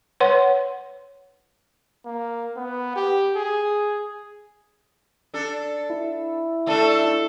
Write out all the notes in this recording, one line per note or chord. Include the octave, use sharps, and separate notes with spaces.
B4 C#5 F#5 C6
A#3
B3
G4
G#4
D4 A4
E4
A3 D4 A4